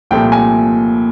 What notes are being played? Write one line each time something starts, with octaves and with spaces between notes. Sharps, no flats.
C2 A#2 F3 A3 G5
G#5